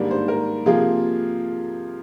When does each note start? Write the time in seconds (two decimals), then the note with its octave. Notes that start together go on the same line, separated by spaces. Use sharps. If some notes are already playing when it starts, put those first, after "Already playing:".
Already playing: G#2 D#3 G3 A#3 D4
0.11 C5
0.28 A#4
0.66 C3 F3 A#3 F4 G#4